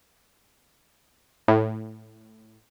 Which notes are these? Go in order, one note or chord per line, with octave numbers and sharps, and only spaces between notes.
A2